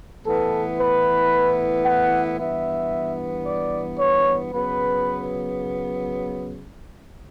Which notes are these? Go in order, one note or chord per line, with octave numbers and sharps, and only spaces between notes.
A2 E3 B3 A4
B4
F#5
G2 E3 B3 E5
D5
C#5
C#3 F#3 B3 B4